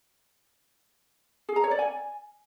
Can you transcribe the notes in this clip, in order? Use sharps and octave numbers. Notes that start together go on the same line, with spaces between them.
G#4
A#5
C#5
D5
G#5